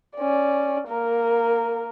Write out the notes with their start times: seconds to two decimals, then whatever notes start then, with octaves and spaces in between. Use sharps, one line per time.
0.16 C#4 D5
0.88 A#3 A#4